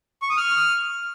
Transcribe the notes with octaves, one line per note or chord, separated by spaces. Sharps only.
C#6
D#6
F6